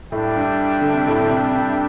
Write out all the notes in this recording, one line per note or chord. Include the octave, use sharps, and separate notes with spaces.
A2 G3 D4 A4 E5 G5
G2
D3
C3
A2
D3
C3
G2